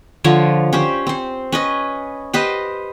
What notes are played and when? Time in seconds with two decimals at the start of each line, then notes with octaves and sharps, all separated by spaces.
0.24 D3 F3 C#5
0.73 C#4 G4 C5
1.07 C4 C5
1.52 C#4 B4 D#5
2.34 G4 B4 C5 D#5